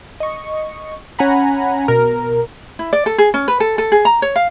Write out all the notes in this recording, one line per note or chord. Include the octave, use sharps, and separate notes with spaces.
D#5 C#6
C#4 F#5 G#5 A#5 B5
B2 A#4
E4
D5
A4
G#4
C#4
B4
A4
A4
G#4
A#5
C#5
F5